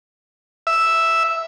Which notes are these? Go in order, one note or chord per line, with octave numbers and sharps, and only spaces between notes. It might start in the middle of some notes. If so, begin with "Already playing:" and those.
E5